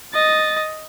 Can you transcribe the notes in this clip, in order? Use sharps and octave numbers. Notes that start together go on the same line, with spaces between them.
D#5 A6